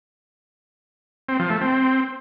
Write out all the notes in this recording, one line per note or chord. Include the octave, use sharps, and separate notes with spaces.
C4
F3
A3
C4